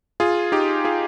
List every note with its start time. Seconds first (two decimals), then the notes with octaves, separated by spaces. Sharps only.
0.20 F4 G#4
0.52 D#4 G4
0.84 F4 G#4